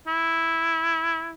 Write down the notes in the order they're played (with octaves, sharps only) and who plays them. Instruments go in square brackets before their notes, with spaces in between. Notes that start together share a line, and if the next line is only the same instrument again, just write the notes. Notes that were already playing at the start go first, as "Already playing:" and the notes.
[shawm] E4